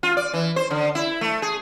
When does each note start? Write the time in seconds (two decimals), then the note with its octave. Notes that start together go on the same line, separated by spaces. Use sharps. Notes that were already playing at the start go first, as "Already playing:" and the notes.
0.03 F4
0.17 D5
0.34 E3
0.56 C5
0.71 D3
0.95 E4
1.21 A3
1.42 G#4